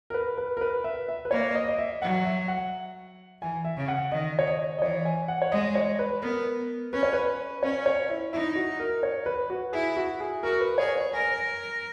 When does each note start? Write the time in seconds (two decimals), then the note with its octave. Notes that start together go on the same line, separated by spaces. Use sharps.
0.10 A#4
0.14 B4
0.38 B4
0.57 A#4
0.61 B4
0.84 E5
1.09 E5
1.25 B4
1.31 A#3 C#5
1.55 D#5
1.68 D#5
1.78 E5
2.02 F#3 F#5
2.25 E5
2.48 F#5
3.42 E3 G#5
3.65 E5
3.77 C#3
3.88 F#5
4.11 D#3 D#5
4.39 C#5
4.47 D#5
4.78 D#5
4.82 E3 C#5
5.05 G#5
5.28 F#5
5.42 C#5
5.52 G#3 D#5
5.75 C#5
5.99 B4
6.22 B3 A#4
6.93 C#4 B4
7.03 C#5
7.13 B4
7.63 C#4 C#5
7.86 C#5
8.09 E4
8.33 D#4 E4
8.56 F#4
8.80 A#4
9.03 C#5
9.26 B4
9.50 F#4
9.73 E4 G#4
9.97 F#4
10.20 G#4
10.43 F#4 A#4
10.61 B4
10.78 G#4 C#5
10.96 C#5
11.13 A#4 G#5